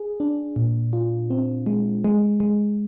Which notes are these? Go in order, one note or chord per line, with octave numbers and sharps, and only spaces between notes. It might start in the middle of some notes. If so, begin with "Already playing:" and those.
Already playing: G#4
D4
A#2
F4
C4
G#3
G#3
G#3